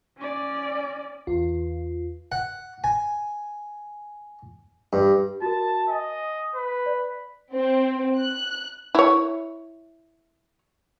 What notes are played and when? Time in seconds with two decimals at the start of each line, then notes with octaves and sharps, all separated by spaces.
0.17 C#4 D5
1.27 E2 F4
2.32 F#5
2.84 G#5
4.93 G2
5.42 F#4 A#4 A5
5.89 D#5 G#5
6.55 B4
6.86 D5
7.53 C4
8.19 F#6
8.95 E4 C#5